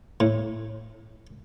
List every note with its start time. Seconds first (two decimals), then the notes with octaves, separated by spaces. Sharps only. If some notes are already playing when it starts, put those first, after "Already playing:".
0.20 A2